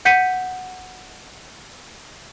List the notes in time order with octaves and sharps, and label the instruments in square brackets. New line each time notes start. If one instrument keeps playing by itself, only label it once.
[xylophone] F#5 G6 B6 C#7 D#7